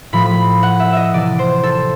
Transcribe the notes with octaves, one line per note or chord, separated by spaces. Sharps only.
A2 F3 B5
B5
F#5
E5
D#5 E5
C3 E3 D5
C5
A4